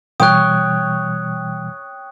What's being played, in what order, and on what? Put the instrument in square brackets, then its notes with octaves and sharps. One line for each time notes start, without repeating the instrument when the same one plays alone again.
[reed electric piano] B2 E3 G3 [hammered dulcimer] C#5 G5 [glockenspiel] D#6 F#6